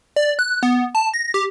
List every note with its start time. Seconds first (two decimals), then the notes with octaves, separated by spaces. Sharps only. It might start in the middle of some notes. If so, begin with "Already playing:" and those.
0.16 D5
0.39 F#6
0.63 B3
0.95 A5
1.13 A#6
1.34 G4